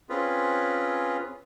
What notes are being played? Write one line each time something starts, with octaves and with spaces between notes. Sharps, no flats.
C4 C#4 F4 G#4 B4